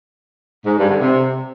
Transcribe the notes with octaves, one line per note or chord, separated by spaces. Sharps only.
G#2
G2
D3
C3